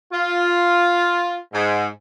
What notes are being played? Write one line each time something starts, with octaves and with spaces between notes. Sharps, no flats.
F4
G#2